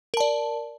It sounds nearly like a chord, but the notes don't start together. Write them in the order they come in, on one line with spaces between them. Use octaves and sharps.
A#4 A5 D5